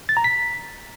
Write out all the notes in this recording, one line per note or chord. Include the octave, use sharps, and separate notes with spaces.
A6
A#5
B6